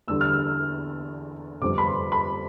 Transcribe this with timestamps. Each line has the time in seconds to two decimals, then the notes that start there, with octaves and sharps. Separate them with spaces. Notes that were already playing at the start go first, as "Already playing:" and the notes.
0.08 E2 D3 G3 E6
0.21 F6
0.33 E6
1.61 G1 F2 C3 D6
1.78 B5
1.86 C6
2.12 B5